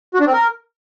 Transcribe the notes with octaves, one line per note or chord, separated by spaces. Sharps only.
F#4
D4
C4
A#4